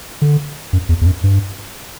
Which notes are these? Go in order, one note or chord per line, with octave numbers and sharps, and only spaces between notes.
D3
F#2
E2
E2
F#2
G2